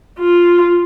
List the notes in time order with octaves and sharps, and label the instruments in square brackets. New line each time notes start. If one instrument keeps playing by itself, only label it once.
[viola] F4